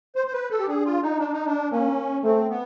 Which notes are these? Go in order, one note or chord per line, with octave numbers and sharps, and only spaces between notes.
C5
C5
B4
A4
G4
D4 G#4
F4
D#4
D4
D#4
D4
A#3 C#4
A3 C4
B3